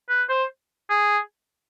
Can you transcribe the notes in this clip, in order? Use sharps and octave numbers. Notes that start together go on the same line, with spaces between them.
B4
C5
G#4